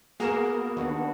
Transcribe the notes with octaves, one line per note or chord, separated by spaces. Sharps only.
A#3 B3 F#4 G#4 A#4 E7
D#2 D4 F#4